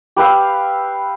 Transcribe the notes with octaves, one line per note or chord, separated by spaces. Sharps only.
G4 B4 E5 F5